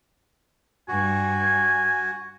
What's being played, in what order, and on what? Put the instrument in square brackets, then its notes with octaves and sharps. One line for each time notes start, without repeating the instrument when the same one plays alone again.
[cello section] G2 [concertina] F#4 [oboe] G#5